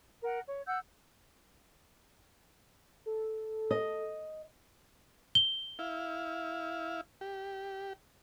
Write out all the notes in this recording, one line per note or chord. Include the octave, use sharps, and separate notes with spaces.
A#4 F#5
C#5
F#5 E6 G6
A4
D#5
G7
E4 F5
G4